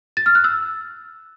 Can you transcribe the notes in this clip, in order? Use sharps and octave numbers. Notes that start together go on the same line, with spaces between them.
A6
F6
F#6
E6